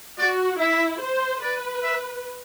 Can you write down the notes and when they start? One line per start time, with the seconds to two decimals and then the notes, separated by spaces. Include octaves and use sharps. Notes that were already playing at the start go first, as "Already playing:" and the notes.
0.18 F#4 D5
0.59 E4 E5
1.01 C5
1.42 B4 D5
1.83 E5